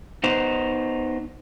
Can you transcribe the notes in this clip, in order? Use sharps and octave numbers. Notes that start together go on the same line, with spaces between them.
B3 D#4 C5